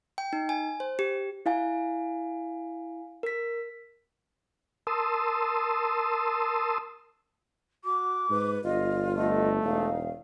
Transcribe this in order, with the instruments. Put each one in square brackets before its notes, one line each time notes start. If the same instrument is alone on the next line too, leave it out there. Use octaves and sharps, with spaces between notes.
[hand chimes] G5
D#4
G#5
C5
G4
E4 F5 G#5
A#4 B6
[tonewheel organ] A#4 A5 C6 D#6 E6
[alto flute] F#4 [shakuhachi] D6
[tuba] G#2 [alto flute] B4
[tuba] G1 [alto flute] F4 [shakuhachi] D#5
[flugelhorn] A3 [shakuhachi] D#5
[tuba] E1 [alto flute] D#4 [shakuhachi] F5